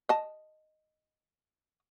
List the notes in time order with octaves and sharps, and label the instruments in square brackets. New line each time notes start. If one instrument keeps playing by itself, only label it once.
[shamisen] D#5 A5